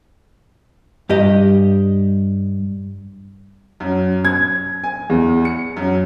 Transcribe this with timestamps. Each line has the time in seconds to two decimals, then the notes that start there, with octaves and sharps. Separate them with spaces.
1.09 G2 G4 D#5
3.80 F#2
4.25 G#6
4.84 G#5
5.10 E2
5.45 C#7
5.77 F#2